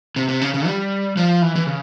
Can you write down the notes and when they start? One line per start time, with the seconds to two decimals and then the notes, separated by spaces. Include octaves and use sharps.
0.16 C3
0.29 C3
0.41 C#3
0.54 C#3
0.67 G3
1.17 F3
1.42 E3
1.56 E3
1.66 C#3